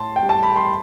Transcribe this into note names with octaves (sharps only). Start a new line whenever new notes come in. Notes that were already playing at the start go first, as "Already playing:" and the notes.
Already playing: A2 A5 C6
G5
G3
A5
B5
C6